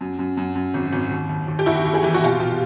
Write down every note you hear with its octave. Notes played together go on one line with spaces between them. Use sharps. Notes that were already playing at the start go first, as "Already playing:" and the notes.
F#2
F#2
F#2
F#2
G#1
G#1
D#2
D#2
D#2
G4
D#2 E4 F#4
D#2
G#4
E3 G4
F#4
B2 F4 G4
B2